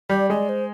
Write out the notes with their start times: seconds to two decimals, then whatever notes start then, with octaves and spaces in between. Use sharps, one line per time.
0.09 G3 D5
0.30 G#3 D5
0.49 C5